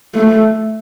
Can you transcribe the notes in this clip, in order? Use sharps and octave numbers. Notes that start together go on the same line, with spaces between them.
A3